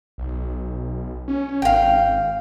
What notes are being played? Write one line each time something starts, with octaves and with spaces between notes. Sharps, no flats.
B1
C#4
G#1 F5 G5